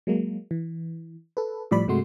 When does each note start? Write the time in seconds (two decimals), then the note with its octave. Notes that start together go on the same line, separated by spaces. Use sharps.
0.07 F#3 G#3 A#3
0.51 E3
1.37 A4 B4
1.71 A2 F3 G3 D5 B5
1.87 G2 C3 G#3 A3 F#4 C6